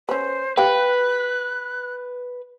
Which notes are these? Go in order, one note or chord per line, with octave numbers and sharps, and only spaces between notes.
C#4 B4 C5
G4 B4 F5 G5 F#6